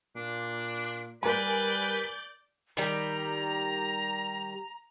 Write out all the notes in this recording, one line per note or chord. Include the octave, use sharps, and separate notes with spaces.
A#2 D4
G3 A#4 B4 D5 G#5 G6
D#3 G3 A#5